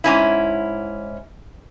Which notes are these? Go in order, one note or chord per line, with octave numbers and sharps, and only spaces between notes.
G#2 C#4 E4